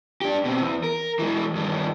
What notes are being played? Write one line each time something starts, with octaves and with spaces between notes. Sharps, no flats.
D4 G4
B2 C4
E2
A#4
E3 G#3
G2 D#3